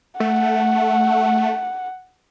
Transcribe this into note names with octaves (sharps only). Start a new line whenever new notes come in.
A3 F#5